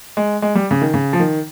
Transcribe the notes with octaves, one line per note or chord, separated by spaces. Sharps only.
G#3
G#3
G3
C#3
D#3
C#3
F3
D#3